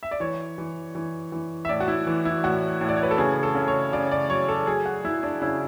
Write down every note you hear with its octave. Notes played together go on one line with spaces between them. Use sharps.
E5
D5
E3 C#5
E3
E3
E3
E5
A2 D5
F#4
E4
E3
E4
A2 F#4
A2
D5
C#5
B4
A4
C#3 G#4
A4
C#3
C#5
C#3 D5
D5
F#3 C#5
A4
F#3 G#4
F#4
F#3 E4
D4
C#3 E4